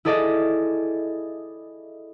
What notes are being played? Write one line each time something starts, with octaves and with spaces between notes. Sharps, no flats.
E4 G#4 A4 D5 D#5